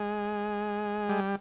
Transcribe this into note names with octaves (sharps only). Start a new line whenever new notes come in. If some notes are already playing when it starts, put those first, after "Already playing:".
Already playing: G#3
G3